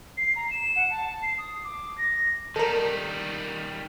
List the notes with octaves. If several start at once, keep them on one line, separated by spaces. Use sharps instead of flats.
C7
A#5
E7
F#5
A5
C7
D#6
D6
A#6
D#3 G3 A4 A#4